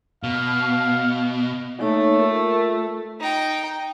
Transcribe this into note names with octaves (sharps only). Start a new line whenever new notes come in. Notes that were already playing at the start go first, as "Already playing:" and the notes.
B2 F5
A3 A#3 D#4 C#5
F4 A#4
F4
D#4 G5